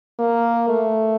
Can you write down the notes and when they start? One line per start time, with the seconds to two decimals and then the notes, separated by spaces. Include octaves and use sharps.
0.19 A#3
0.69 A3